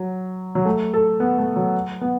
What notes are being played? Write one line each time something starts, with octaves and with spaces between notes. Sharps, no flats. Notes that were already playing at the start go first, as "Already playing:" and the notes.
Already playing: F#3
F#3
A3
A4
B3
A3
F#3
B3